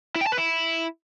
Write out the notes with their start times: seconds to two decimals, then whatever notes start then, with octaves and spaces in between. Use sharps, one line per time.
0.16 E4
0.21 G5
0.27 A5
0.32 B4
0.38 E4